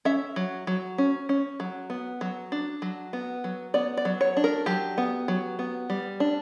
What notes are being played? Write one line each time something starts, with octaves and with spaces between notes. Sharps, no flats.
C#4 E5
F#3
F#3
C#4
C#4
F#3
B3
F#3
D4
F#3
B3
F#3
B3 D5
D5
F#3
C#5
D4
A#4
F#3 G4
B3
F#3
B3
G3
D4